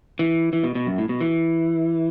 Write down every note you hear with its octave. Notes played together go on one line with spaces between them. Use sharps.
E3
E3
B2
B2
F#2
A2
B2
E3